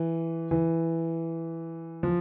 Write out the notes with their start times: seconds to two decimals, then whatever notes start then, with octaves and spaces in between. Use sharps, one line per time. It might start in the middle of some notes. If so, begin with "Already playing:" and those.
Already playing: E3
0.51 E3
2.03 F3